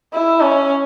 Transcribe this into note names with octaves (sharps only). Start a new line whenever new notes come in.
E4
C#4